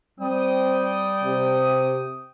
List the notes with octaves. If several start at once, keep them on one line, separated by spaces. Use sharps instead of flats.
G3 C4 G5 D#6
C3